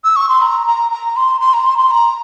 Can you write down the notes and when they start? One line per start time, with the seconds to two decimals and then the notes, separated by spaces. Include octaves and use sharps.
0.04 E6
0.16 C#6
0.29 C6
0.42 A#5
0.67 A#5
0.92 A#5
1.16 C6
1.41 C6
1.53 A#5
1.66 C6
1.78 C6
1.91 A#5